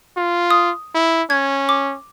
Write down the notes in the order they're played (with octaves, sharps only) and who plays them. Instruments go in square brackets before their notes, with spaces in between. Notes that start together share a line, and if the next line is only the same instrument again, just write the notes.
[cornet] F4
[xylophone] D#6
[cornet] E4
[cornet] C#4 [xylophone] G#6
[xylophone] D6